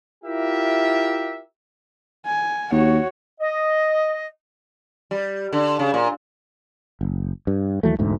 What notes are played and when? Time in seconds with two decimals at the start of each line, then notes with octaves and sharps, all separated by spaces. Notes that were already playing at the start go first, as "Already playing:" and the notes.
0.24 E4 F4 G4 A#4 E5
2.26 G#5
2.72 D#2 F#4 C#5
3.41 D#5
5.11 G3
5.53 D3
5.79 C#3
5.94 A#2
7.01 F#1
7.47 G2
7.83 D#2 E3 F#3 A3
7.99 E1 D2 G#2 A3